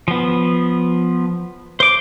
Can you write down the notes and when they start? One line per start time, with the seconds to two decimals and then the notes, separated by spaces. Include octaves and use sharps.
0.08 F3 B3
1.80 C5 D6